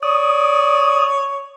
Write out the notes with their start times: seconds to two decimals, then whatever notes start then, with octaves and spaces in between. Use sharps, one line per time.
0.03 C#5 D5 D#6